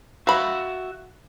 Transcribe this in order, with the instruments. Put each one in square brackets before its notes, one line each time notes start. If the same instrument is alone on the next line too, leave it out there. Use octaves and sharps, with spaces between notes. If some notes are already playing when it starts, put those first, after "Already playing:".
[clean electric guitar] F#4 E5 [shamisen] F5 B5